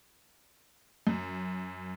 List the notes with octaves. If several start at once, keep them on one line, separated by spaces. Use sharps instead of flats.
F#2